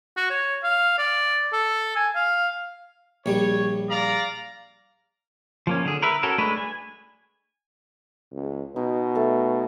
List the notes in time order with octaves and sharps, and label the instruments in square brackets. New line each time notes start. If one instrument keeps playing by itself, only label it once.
[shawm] F#4
C#5
F5
D5
A4
G#5
F5
[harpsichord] A#1 G3 [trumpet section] C#5
[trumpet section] D5 F5 A#5
[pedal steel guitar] F3 A#3 C#4
D3 G#4
A#4 B4 E5
C#4 F#4 A4 A#4
G#3 A3 D4 B4
G#5
[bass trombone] C#2
[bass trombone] B2 [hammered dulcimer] D#4
[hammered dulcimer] A3 A4